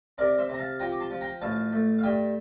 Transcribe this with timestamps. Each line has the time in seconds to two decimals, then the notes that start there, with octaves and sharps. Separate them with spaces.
0.18 C3 A#4 D5
0.38 C5 E5
0.49 C3 A#5
0.59 F5 A5
0.80 F3 G5 A#5
0.92 D6
1.00 A5 C6
1.11 F3
1.21 G5 A#5
1.41 A1 F5 A5
1.72 A3
1.99 F5
2.03 G2 E5 G5